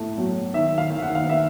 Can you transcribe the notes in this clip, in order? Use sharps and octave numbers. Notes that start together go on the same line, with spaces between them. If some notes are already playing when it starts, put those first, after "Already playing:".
Already playing: A2 A3
F#3
D#3 E5
F5
D#3
F#5
F5
B3 E5